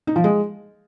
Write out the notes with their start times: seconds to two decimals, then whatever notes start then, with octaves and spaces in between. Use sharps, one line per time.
0.07 D#4
0.16 F3
0.24 G#3